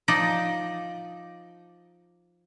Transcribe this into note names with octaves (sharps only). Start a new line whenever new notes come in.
F3 D#4 D5 D#5